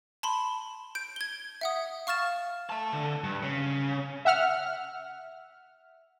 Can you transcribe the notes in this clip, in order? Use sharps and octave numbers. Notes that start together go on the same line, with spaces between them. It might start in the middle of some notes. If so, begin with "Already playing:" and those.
A5 B5 C6
G6 D7
G#6 G7
E5 F#5 D#6
F5 C#6 F6 A6 E7
E5 A5
D3
G2
C#3
E5 F#5 F6